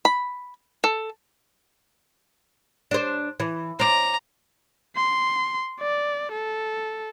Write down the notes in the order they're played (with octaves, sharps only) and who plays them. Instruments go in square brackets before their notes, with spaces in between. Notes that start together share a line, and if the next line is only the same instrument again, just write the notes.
[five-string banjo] B5
A4
[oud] D4 C5
E3
[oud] C5 D5 [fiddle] A#5
[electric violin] C6
D5
A4